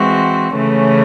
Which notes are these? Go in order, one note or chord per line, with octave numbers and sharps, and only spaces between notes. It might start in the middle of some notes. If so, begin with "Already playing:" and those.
Already playing: E3 G#3 C4 F#4
C#3 E3 A3 C#4